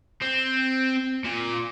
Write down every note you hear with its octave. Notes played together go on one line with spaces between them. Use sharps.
C4
A#2